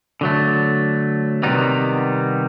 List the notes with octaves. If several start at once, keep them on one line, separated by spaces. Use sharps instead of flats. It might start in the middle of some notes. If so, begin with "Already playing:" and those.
D3 F#3 A3
C3 D#3 G3 B3 D#4